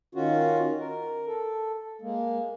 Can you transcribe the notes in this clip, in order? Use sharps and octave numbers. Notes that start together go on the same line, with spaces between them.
D#3 C#4 F4 F#4
A#4
A4
G#3 A#3